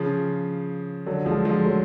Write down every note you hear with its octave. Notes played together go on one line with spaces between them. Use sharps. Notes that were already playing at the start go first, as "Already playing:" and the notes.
Already playing: C#3 F3
D3 F#3
F3 G#3
F3 G#3
F#3 A3